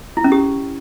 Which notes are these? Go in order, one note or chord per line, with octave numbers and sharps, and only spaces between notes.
E4
C#4
G4